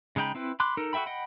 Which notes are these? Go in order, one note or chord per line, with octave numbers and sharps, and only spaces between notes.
C#3 G#3 D#4 G5 B5
C4 E4 B4
B5 C6 D6 F#6
D#4 A4 A#4
F#4 A4 E5 G5 B5
D#5 F#5 G5 B5